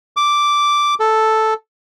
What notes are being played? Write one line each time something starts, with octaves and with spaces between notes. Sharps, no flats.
D6
A4